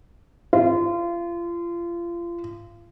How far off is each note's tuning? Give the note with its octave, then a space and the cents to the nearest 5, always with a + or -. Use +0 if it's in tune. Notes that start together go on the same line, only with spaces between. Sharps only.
F4 -30